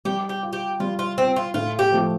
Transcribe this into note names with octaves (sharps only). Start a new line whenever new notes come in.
G3 G4
G4
F4
G4
G3 F4
F4
C4 F4
F4
A2 F4
G4
F3 A3 F4